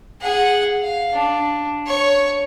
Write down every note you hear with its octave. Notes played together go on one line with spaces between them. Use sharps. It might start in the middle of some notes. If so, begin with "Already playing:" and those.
G#4 F#5
F5
D4
C#5 C#6